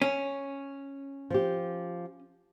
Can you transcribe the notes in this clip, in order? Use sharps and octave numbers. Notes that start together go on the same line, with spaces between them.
C#4
F3 G4